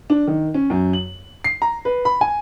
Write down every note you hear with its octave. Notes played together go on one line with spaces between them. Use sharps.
D4
D#3
C#4
F#2
F#7
C7
A#5
B4
B5
G#5